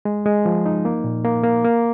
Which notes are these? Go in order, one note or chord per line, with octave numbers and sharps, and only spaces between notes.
G#3
G#3
F3
D#4
A#3
A#2
A#3
A#3
A#3